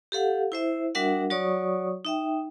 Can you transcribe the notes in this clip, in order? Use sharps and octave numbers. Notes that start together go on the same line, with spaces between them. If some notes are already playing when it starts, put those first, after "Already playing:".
G4 A4 F5 F#5
E4 C5 E5
G3 D4 F#4 A#4 E5 F#5
F#3 F#4 C#5 D5 C#6 D#6
D#4 E5 G5